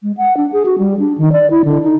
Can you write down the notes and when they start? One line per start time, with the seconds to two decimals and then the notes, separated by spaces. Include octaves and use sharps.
0.03 G#3
0.17 F#5
0.37 D4
0.52 G#4
0.66 F#4
0.78 G3
1.00 D4
1.18 D#3
1.32 D5
1.50 E4
1.65 D3
1.83 D#4